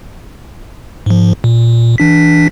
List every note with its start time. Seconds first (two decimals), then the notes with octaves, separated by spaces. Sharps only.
1.06 G#2 F3
1.44 A#2
1.98 E3 D4 B6